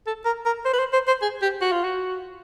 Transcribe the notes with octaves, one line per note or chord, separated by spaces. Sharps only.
A4
A#4
A#4
C5
B4
C5
C5
C5
G#4
G4
F#4
F4
F#4